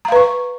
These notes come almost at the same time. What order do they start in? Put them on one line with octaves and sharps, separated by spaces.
A#5 F5 B4 C#6